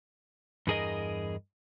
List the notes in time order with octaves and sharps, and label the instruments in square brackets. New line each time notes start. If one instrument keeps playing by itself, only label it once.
[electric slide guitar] E2 G2 G#4 A#4 D#5